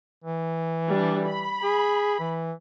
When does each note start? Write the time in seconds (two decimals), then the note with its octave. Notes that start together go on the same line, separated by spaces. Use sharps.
0.24 E3
0.89 G3 D4
1.28 B5
1.63 G#4
2.19 E3